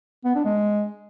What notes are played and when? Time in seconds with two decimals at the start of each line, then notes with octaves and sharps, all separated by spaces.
0.25 B3
0.35 D4
0.45 G#3